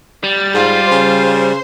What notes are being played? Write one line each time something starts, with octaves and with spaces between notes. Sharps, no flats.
G3 A6
G#2 F4 C5 C6
C#3